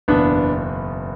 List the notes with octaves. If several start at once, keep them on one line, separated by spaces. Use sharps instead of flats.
F#1 E2 B2 B3 D4